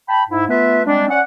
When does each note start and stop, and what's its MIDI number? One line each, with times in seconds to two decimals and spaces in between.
0.08 0.22 79
0.08 0.22 81
0.08 0.22 83
0.29 0.43 44
0.29 0.43 64
0.49 0.82 57
0.49 0.82 59
0.49 0.82 65
0.49 0.82 71
0.49 0.82 76
0.86 1.07 55
0.86 1.07 56
0.86 1.07 60
0.86 1.07 62
1.09 1.20 61
1.09 1.20 74
1.09 1.20 78